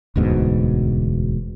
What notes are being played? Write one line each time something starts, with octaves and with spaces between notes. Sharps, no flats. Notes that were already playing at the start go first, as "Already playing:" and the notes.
E1 D2 G#2 B2